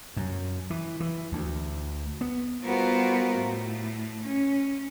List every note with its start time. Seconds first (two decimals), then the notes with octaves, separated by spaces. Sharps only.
0.16 F#2
0.70 E3
1.00 E3
1.32 D2
2.21 B3
2.66 G3 B3 F4 F#4 A#4 C5
3.37 A2 A3
4.23 C#4